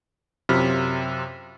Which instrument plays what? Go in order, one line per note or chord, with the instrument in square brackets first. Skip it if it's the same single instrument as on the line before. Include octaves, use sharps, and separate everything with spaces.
[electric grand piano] F#2 C3 F4 B5 F6